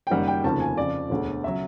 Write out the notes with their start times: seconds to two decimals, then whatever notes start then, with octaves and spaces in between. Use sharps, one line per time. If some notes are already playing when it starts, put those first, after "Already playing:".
0.07 G5
0.10 F#1 F#2 D#3 G3 F#5
0.28 G5
0.44 F1 D#2 C#3 F3 A5
0.60 G#5
0.77 F2 C#3 F3 D5
1.10 E1 D2 D3
1.44 C#3 F#3 E5